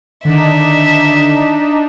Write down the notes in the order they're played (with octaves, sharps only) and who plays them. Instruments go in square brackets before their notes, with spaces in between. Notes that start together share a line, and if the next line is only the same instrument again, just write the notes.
[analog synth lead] D3 [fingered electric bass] D#3 [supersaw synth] D4 D#4 [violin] E5